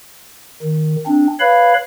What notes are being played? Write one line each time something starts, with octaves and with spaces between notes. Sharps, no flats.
D#3
C4 D4
B4 C#5 F5 B5